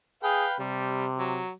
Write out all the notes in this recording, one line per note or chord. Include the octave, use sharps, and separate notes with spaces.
G#4 B4 F5 G5
C3 G3
F#3